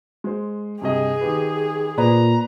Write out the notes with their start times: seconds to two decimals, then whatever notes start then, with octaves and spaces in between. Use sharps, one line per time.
0.24 G#3 C5
0.82 G2 C3 G#4 D#5
1.21 D#3 G4 B4
1.98 A#2 B4 C5 D5 A#5